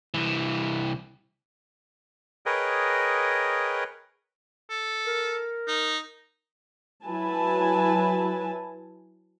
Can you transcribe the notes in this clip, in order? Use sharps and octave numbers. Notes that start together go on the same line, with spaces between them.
C2 E3
G#4 A#4 B4 C#5 D#5 G5
A4
A#4
D#4
F#3 E4 B4 G#5 A5